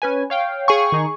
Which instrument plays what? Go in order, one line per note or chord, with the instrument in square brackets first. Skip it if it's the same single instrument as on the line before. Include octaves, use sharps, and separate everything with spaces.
[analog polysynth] C#4 B4 G#5
C#5 F5 G5
[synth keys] G#4 G#5 C#6
[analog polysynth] D#3 D#4